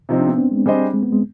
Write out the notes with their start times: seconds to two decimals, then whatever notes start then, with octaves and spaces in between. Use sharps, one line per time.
0.09 C3 F3 C4 D#4
0.18 D4
0.29 B3
0.38 C4
0.51 G#3
0.65 G3 C4 D4 G#4 C5 D#5
0.94 G#3
1.03 B3
1.12 G#3